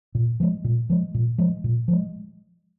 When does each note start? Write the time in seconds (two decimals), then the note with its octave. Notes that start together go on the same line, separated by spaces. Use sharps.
0.15 A#2
0.40 F3 G#3
0.64 A#2
0.90 F3 G#3
1.14 A#2
1.38 F3 G#3
1.64 A#2
1.88 F3 G#3